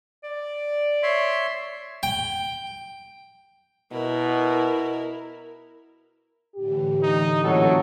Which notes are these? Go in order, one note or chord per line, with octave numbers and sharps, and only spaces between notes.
D5
C#5 E5 C6
G5
B2 E4 A#4
A2 D3 E3 G4
D#4
A#2 F#3 C#4 E4 A4